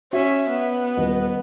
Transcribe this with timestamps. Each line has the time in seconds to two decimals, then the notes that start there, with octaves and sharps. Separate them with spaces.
0.13 C#4 F#4 E5
0.50 B3
0.97 D#1 D#5